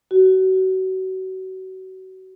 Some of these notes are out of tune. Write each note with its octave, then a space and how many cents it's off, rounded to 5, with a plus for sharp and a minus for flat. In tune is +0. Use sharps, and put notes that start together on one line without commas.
F#4 +30